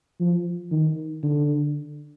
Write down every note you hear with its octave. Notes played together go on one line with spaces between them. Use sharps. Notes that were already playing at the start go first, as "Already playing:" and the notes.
F3
D#3
D3